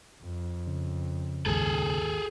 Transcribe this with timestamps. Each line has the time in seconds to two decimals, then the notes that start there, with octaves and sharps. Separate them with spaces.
0.22 F2
0.67 C#3
1.46 A#1 D#2 G#2 G#4 A4